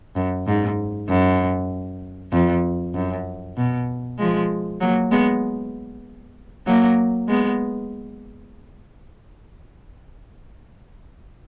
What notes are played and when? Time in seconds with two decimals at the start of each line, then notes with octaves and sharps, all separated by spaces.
0.16 F#2
0.47 G#2
1.09 F#2
2.33 F2
2.95 F#2
3.58 B2
4.19 F3 G#3
4.81 F#3 A#3
5.12 G#3 B3
6.67 F#3 A#3
7.29 G#3 B3